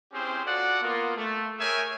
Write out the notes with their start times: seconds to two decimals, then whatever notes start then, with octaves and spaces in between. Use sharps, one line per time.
0.13 C4 C#4 E4 G4 G#4 C5
0.45 F4 F#4 A4 D5 F#5
0.82 A#3 B3 F4
1.16 A3
1.59 G#4 A#4 C#5 E5 G5 G#5